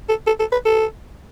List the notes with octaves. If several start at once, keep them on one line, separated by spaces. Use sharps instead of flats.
A4
A4
A4
B4
A4